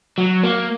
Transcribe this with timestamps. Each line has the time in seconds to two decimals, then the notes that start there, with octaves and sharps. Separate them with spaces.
0.18 F#3
0.44 A#3